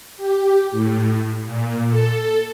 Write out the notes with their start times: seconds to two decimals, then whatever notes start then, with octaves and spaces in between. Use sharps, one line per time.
0.17 G4
0.71 A2
1.45 A#2
1.89 A4